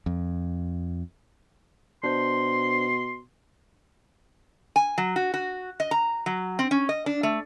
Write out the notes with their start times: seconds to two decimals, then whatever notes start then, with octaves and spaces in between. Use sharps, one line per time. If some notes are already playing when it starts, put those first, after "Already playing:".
0.06 F2
2.04 B2 D4 C5 C6
4.76 G#5
4.98 F#3
5.16 F#4
5.34 F#4
5.80 D#5
5.91 A#5
6.26 F#3
6.59 C4
6.71 C#4
6.89 D#5
7.06 D4
7.23 A3